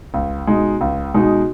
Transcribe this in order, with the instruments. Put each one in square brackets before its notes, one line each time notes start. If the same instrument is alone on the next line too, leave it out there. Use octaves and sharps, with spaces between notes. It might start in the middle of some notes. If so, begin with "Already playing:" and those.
[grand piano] C#2
B2 G#3 D#4
C#2
B2 G#3 D#4